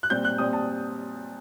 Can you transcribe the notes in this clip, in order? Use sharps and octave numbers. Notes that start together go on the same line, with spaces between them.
F#6
A#2 G3 C4 G6
F#6
A#2 G3 C4 D#6
A5